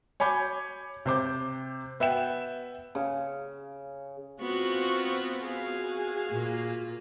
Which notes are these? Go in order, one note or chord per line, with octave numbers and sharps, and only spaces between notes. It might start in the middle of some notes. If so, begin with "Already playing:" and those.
C#5 G#5 B5 D6 G6
C3 C5 D6 G6
B3 E5 G5 E7
C#3
B3 C4 F4 F#4 C#6 F#6
F#4 G#4 F5
A#2 A#3 F4